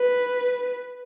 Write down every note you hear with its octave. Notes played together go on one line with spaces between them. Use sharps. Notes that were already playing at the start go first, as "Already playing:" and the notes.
Already playing: B4